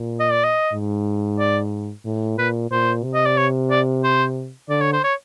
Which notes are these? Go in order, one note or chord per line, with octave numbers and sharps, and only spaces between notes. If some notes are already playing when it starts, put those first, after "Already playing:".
Already playing: A#2
D#5
D5
D#5
G#2
D5
A2
A#2 B4
A#2 C5
C3
D#5
D5
C#5
D5
C5
D3 D5
C#5
C5
C#5